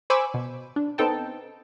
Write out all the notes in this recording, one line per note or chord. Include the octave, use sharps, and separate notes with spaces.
C5 G#5 B5 C#6 D6 E6
B2
D4
B3 C4 D#4 A4 G5 A5